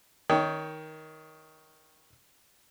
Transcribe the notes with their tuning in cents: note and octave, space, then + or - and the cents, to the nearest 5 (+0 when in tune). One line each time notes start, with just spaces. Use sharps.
D#3 +10 C#5 +25 G5 -5